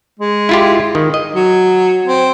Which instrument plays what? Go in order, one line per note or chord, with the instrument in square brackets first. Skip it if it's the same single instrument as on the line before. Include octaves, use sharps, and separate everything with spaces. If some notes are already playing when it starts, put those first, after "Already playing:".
[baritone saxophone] G#3
[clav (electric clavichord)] E4 F4 G4
D#3
D#5
[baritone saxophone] F#3
C4